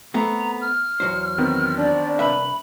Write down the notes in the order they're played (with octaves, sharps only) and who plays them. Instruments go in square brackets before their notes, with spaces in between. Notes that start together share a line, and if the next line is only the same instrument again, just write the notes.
[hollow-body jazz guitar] A3 B3 C4 [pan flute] A#5
[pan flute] F6
[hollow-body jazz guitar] E2 F#3 C5
[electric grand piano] D#3 B3 C4
[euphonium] D4 [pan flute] D5
[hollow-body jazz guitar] C2 B4 E5 [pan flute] B5